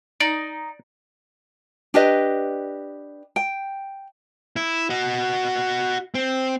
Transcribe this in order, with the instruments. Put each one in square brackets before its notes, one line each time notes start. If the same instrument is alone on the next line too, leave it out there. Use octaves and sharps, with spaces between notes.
[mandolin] D#4 [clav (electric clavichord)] D5
[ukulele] D4 G4 B4 D#5
G5
[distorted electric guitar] E4
F#4 D#5
C4